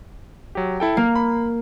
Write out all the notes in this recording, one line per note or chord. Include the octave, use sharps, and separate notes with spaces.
F#3 G4
E4 A4 G5
A#3 F5
B5